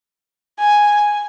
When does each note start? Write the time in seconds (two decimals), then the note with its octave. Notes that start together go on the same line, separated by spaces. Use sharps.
0.60 G#5